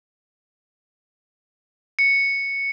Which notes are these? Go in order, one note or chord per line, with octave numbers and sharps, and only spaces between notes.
C#7